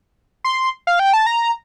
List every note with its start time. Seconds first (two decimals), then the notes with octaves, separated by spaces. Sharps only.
0.44 C6
0.87 F5
0.99 G5
1.13 A5
1.26 A#5